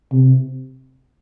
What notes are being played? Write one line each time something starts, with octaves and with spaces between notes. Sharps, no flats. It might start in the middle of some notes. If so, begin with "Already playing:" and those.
C3